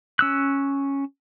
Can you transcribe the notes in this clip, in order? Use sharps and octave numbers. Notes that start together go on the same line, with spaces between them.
C#4 E6 F#6